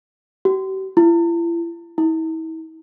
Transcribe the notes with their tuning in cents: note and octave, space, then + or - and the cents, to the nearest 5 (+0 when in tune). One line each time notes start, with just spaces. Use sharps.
G4 -45
E4 +40
E4 -40